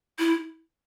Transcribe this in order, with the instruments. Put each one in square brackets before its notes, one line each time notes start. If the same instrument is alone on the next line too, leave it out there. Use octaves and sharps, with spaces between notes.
[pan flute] E4